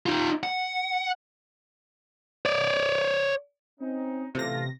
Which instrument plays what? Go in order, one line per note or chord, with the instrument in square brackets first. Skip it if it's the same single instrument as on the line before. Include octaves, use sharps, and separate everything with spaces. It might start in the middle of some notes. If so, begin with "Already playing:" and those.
[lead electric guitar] D#4 F4
F#5
C#5 D5
[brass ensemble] C4 C#4 D#4
[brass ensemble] A1 A3 F4 [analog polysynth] C3 A#6